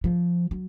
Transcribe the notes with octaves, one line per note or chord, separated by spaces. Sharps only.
F3
F#3